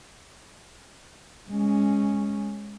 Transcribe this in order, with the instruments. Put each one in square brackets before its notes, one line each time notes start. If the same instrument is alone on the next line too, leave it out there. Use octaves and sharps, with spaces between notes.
[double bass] G#3 C#4